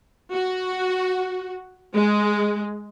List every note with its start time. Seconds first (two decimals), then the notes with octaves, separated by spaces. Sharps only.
0.34 F#4
1.95 G#3